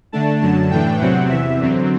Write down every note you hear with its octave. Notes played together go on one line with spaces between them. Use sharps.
D3 A3 D4 A5
F#2 D3 F#3 A5
A2 E3 A3 D4 G5
E2 C3 F#3 C4 F#5
E2 C3 E3 E5
F#2 D3 F#3 C4